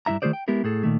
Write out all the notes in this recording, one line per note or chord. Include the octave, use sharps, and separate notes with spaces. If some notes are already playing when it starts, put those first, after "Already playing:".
G2 C3 E4 E5 A#5
D#3 A3 F4 G#4 C5 D5
G5
G#3 B3 E4 G4 A#4
A2 G#4 A4
A#2 D#3 A3